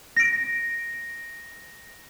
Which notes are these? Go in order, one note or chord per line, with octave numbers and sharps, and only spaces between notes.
A#6 D7